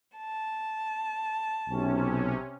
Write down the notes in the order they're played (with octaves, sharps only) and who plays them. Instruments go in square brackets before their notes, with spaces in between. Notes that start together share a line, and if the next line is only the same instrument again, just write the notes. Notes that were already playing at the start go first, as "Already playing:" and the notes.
[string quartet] A5
[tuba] B1 [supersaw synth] C3 C#4